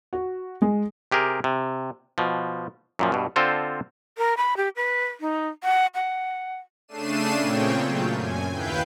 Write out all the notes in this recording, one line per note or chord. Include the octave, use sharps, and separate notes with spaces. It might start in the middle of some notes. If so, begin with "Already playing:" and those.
F#4
G#3
C3 G4 G#4 A#4
C3
B2 F3
F#2 A#2 F3
G2 B2
D3 C4 F4 A4 C5
A#4
B5
G4
B4
D#4
F#5
F#5
C#3 A3 D4 C7 D#7 E7
A#2 C#3 C4 C#5 G5
A#2 F#3 A3 F4 G6
F#2 G#5
D#2 E4 B4 F5 G5 G6